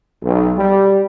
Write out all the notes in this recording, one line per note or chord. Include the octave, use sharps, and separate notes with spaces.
B1
G3